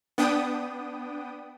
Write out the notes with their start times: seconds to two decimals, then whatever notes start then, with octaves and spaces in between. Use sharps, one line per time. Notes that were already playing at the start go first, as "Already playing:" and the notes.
0.18 B3 D4 G5 D#6